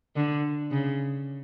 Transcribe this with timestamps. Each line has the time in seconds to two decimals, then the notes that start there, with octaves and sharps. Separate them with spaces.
0.16 D3
0.72 C#3